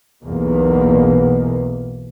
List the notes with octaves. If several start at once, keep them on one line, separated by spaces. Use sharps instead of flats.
B1 E2 B2 A#3